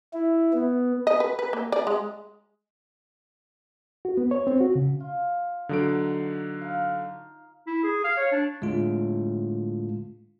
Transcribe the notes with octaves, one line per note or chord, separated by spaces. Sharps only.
E4
B3
D#5
B4
B4
A#3
D5
G#3
F#4
B3
C#5
C4
F#4
C#3
F4
D3 F#3 D#4 D7
F5 A#5
E4
G#4
F5
C#5
D4
A2 D3 G#3 F4